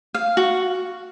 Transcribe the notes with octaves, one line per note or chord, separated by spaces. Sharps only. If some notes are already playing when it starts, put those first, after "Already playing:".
F5
F#4